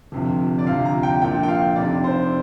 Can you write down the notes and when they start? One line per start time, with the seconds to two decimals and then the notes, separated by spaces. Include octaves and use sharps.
0.12 G1 F2 C3 F3
0.59 D5
0.66 D2 C3 F3 F5
0.85 A#5
1.03 G5
1.21 A#1 A#2 F3 G5
1.43 G5
1.48 F5
1.76 F1 F2 C3 D5
2.04 C5